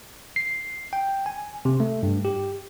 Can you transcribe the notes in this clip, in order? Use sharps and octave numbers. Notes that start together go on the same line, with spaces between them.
C7
G5
G#5
C3
A3
G2
G4